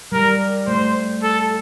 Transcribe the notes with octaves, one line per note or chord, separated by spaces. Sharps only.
G3 A#4
A3 C5
A4